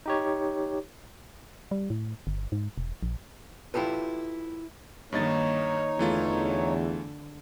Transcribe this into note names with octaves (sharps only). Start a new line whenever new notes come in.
D#4 G4 C#5
G3
A2
G1
G#2
E1
A#1
E4 F4 G4 A4 B4
G2 D#3 A#3 D#4 C#5 D#5 A6
E2 D3 E3 A3 F4